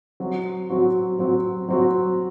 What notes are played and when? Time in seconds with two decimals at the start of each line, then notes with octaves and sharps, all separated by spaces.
0.20 F#3 C4 F#4
0.70 F#3 C4 F#4
1.19 F#3 C4 F#4
1.68 F#3 C4 F#4